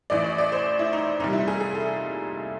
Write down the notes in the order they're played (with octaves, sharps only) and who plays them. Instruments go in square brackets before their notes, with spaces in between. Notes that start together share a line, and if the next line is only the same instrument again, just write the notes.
[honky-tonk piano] A1 A2 E3 D5
D5
D5
C5
E4
D#4
C2 A#2 G3 D#4
E4
G#4
G#4
A4